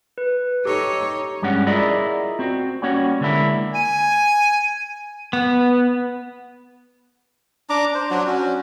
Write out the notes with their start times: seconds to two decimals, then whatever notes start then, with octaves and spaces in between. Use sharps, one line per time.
0.18 B4
0.65 D#4 G4 A4 C#5
1.42 G2 G3 G#3 C#4 F#5
1.67 E4 F4 G#4 A#4 D5 D#5
2.39 C4 F#4
2.82 G3 A#3 C#4 F#4 C#5 F#5
3.21 D3 G#3 A#3 D4 E4
3.74 G#5 D#7
5.33 B3
7.70 D4 A#5 D6
7.95 C5
8.11 F#3 D4 F#4
8.27 C#4 F#4